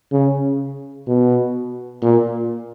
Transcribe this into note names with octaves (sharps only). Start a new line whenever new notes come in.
C#3
B2
A#2